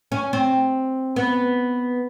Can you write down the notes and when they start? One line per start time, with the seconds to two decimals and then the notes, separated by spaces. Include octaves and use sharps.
0.12 C#4
0.33 C4
1.16 B3